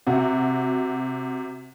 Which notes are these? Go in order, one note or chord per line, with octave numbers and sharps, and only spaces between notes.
C3 F#4